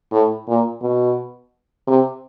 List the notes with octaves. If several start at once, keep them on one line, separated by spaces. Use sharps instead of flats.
A2
A#2
B2
C3